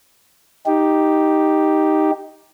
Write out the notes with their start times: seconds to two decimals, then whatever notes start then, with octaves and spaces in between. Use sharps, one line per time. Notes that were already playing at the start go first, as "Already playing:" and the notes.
0.66 D#4 G4